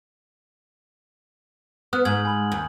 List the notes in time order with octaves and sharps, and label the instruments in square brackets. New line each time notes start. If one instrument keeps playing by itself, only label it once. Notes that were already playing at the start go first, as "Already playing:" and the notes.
[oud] B3 [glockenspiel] D#6 F6 F#6
[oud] G#2 [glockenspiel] G#6 F#7
[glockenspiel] G#5 B5 F#7
[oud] D#2